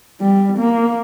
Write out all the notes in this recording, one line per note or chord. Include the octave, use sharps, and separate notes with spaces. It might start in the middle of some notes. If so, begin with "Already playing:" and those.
G3
A#3